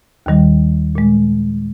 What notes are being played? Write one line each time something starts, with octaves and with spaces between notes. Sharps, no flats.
D#2 D#3 G3
A#2 G#3